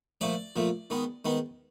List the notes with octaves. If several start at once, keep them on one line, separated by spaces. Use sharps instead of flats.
A#2 F3 A3 D5
A#2 F3 A3
D#3 G#3 B3
D#3 G#3 B3